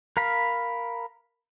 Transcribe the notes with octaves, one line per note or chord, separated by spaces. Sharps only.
A#4 F5 B5